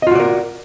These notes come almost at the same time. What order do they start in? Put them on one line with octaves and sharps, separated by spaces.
D#5 F4 F#4 D5 A#4